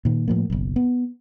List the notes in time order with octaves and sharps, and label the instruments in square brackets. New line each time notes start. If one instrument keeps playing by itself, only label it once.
[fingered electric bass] A#2 D#3
A2 F3 A#3
F#1 B1
B3